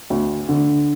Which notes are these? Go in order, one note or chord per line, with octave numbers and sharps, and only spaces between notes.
D2
D3